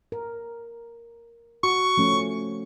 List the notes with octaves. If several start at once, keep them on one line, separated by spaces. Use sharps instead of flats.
A#4
F#4 C#6
F3 A3 C#4